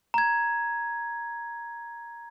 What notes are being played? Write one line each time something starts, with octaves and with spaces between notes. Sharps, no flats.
A#5 G#6